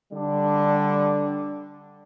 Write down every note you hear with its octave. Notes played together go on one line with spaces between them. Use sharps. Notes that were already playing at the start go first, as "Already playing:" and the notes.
D3 G3 D4